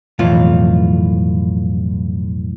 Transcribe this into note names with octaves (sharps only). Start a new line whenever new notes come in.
B1 F2 A2 E3 F4